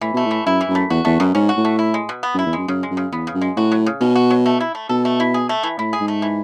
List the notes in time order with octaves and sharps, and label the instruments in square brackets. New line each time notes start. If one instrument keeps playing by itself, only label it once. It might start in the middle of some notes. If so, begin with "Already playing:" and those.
[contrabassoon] A2 [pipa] E3
[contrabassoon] B2 [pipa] A3
[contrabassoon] A2
[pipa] E3
[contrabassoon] F#2 [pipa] E4
[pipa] E3
[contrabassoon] F#2
[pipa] A3
[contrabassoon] E2 [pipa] F#4
[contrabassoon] E2 [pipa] A3
[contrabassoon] F#2 [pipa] B2
[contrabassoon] G#2 [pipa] C#4
[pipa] F#4
[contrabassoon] A2
[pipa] A3
E4
G#3
B2
B3
[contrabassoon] F#2
[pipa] E4
[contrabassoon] E2
[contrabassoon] F#2 [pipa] G#3
[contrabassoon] F#2 [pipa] C#3
[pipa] G#3
[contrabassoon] F#2
[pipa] C#3
[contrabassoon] E2 [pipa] B3
[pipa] C#3
[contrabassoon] F#2
[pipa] G#3
[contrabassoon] A2 [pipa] F#4
[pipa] F#3
C#3
[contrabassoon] B2 [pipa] C#4
[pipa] F#4
F#3
A3
E4
A3
[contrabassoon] B2 [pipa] A4
[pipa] A3
E4
G#4
A3
E3
[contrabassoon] A2 [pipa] E4
[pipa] G#4
[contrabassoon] G#2
[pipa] A3
E3